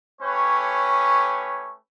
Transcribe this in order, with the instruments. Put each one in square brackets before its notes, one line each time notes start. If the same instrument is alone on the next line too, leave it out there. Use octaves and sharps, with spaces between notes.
[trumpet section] A3 C#4 G4 B4 C#5 C#6